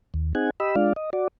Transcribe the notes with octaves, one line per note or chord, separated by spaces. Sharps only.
D#2
C4 D#4 G#4 F#5 G#5
G4 D#5 B5 E6
G#3 D4 F4 D5 F5
D#5
F#4 D5